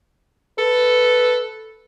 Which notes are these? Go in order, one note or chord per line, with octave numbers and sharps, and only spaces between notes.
A4 B4